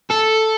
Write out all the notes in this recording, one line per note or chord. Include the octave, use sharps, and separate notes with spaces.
A4